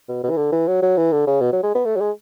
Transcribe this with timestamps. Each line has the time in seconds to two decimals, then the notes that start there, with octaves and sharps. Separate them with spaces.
0.08 B2
0.23 B2
0.30 E3
0.37 D3
0.52 E3
0.67 F#3
0.82 F#3
0.97 E3
1.12 D3
1.27 C#3
1.41 B2
1.52 F#3
1.63 G#3
1.75 B3
1.85 A3
1.96 F#3
2.01 G#3